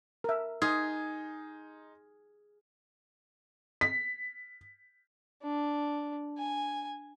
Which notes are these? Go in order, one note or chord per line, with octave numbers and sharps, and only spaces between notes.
A#4 E5
D#4 G#4 C6 F6
B6
D4
G#5